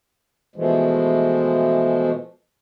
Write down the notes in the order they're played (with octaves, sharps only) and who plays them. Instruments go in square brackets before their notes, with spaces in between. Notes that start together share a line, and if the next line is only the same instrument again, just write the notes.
[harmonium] B2 E3 F3 G#3 A3